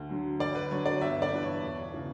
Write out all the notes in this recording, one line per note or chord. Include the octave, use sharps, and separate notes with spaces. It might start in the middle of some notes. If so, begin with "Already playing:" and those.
Already playing: D2
D3 F#3
D2 D5
B4
D3 F#3 C#5
D5
G1 E5
D5
G2 E3 B4
C#5
E1
C#3 E3